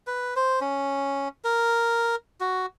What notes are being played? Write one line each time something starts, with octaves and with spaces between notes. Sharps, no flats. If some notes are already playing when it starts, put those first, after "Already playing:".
B4
C5
C#4
A#4
F#4